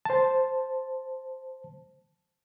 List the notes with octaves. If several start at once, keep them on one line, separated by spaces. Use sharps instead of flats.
C5 A5